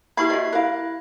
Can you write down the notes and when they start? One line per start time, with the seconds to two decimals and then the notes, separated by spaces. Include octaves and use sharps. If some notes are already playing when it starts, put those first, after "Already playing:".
0.17 A#3 E4 G4 E5 B5 G#6 C7
0.30 F#4 D5 D#5
0.53 E4 A#4 F5 F#6